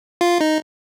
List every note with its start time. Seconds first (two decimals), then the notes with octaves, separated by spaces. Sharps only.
0.21 F4
0.41 D#4